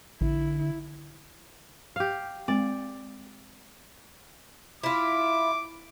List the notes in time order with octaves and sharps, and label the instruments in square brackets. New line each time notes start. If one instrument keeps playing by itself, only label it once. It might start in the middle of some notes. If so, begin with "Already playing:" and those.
[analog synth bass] A#1 [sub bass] D3 [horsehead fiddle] E4
[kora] G4 F5
[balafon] G#3 C4 [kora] D5
[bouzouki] E4 F4 [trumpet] D6